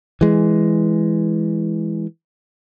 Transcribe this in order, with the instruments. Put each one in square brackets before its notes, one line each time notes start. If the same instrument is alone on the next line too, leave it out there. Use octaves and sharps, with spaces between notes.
[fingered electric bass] E3 G#3